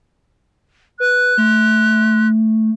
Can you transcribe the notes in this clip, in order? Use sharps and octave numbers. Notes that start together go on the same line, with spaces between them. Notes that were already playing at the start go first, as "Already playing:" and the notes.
B4 F#6
A3